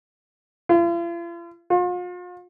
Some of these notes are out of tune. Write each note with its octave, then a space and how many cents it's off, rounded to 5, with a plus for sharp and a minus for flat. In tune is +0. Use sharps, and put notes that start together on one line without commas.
F4 -45
F4 +40